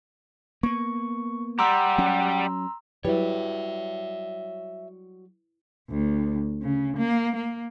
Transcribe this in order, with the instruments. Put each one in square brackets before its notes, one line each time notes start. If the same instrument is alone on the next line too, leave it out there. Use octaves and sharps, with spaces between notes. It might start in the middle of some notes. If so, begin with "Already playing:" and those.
[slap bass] A#3 B3 [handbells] C#6
[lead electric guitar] G3 G4 [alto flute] F#5 [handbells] A#5 C6 E6
[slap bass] F#3 C#4
[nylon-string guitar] F#3 G3 [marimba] E4 B4 [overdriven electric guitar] C#5 E5
[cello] D2
C#3
A#3
A#3